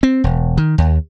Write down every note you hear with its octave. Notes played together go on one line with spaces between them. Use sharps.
C4
E1
D#3
D#2